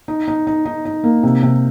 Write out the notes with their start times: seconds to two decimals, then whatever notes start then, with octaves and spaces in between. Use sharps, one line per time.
0.08 D#4
0.28 D#4
0.47 D#4
0.65 D#4
0.85 D#4
1.04 A#3
1.23 C3
1.43 C3